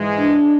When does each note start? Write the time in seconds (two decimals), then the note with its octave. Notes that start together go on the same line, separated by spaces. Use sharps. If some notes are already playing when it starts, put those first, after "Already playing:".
Already playing: G#2 E3 G#3
0.17 D4